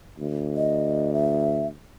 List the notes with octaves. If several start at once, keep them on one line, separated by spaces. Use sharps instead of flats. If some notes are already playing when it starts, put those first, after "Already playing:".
D2
D#5
E5